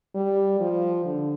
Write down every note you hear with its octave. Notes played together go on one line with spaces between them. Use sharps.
G3
F3
D3